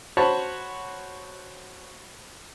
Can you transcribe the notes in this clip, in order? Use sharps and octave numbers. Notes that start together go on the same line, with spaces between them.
F#4 C5 C#5 A5 B5